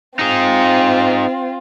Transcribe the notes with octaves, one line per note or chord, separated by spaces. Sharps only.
C4 D#4 F4 G#4